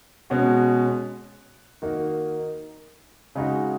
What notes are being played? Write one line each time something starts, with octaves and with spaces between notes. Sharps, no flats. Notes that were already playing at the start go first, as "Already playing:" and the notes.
B2 G#3 C#4 F#4
D#3 A#3 D#4 F#4
C#3 G#3 D#4 F#4